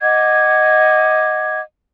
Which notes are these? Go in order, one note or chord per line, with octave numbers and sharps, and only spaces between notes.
D#5 F#5 D6 G#6